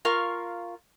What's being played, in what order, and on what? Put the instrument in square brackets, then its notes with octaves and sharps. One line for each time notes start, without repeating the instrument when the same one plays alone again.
[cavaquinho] F4 A#4 F5 C#6